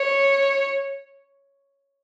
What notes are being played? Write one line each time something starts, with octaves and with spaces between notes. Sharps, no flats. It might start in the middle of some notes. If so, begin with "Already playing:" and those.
Already playing: C#5